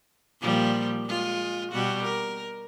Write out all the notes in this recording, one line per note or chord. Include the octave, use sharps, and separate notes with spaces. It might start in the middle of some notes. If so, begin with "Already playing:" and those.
A#2 F3 G3
G#3 F4
B2 G3 F#4
A#4